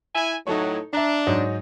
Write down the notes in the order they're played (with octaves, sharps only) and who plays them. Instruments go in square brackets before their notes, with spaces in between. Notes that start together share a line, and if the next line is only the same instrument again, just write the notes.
[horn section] E4 G#5
[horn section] A2 F#3 [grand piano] D#4 A4 C#5
[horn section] D4 [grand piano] E5 A#5
[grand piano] G#2 F#3 D#4